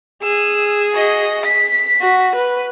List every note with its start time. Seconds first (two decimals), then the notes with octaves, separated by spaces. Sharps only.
0.23 G#4 E6 D#7
0.94 F#4 D#5
1.45 B6
2.01 F#4
2.36 B4